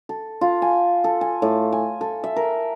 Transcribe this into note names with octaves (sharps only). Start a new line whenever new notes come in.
A4
F4
G#5
A4
G#5
A2
G#5
A4
E5
A#4